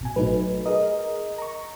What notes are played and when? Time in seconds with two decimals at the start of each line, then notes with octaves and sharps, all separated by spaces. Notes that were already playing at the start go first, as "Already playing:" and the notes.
0.01 A1 B2 G#5
0.16 F#3 A3 D#4 B4
0.66 G#4 A#4 D#5
1.38 A#5 C#6